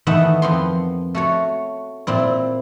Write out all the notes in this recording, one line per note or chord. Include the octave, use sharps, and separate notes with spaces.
D#3 E3 A3 B3 E5 F#5
F2 B3 C6
A3 F#4 C#5
A#2 C4 E4